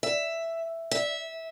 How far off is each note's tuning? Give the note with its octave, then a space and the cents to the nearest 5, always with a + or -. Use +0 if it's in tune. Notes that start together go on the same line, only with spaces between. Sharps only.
E5 +5
E5 -15